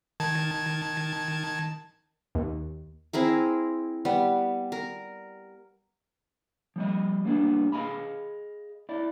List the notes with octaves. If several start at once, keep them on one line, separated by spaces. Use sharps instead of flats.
D#3 A5 G#6
D#2
C4 E4 G#4 A#4
G3 B3
A#4
F3 G3 D#5
G3 A#3 B3 D4
G#4 D#5 F5 G#5 B5
E4 D5